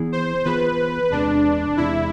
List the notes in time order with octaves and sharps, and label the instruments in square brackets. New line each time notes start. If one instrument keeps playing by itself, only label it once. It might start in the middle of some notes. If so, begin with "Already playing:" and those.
Already playing: [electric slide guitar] E3 B3 E4 G#4
[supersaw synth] C5
[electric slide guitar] E3 B3 F4 G#4 [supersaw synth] B4
[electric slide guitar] E2 C3 G#3 [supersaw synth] D4
[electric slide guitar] E2 C3 G#3 [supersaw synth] E4